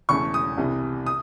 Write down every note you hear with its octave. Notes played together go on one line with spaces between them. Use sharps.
E1 E2 C#3 E3 A3 C#6
D#6
C2 C3 E3
D#6